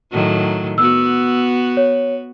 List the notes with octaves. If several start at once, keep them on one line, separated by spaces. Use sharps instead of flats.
A2 D#3 F#3
B3 F#4 E6
C#5